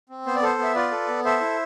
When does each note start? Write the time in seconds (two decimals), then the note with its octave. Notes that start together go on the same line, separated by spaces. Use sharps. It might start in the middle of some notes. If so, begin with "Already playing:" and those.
0.09 C4
0.26 B3 C5
0.35 D5
0.42 A4 C5
0.59 B3 E5
0.75 F4 B4 D5
0.91 A4
1.08 B3
1.25 A4 C5 E5
1.41 E4